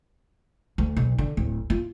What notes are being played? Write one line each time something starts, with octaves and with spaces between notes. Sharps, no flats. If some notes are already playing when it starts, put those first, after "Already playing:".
D2
B1
D3
D1
F4